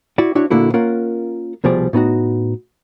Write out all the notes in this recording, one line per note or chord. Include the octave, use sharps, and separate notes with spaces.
E4 F#4 D5
D4 E4 F#4 C#5
A#2 D3 A#3 E4 F#4
A#3 C#4 F4 A#4 F#5
C2 B2 F3 G3 G#4 D5
A2 B3 D#4 F#4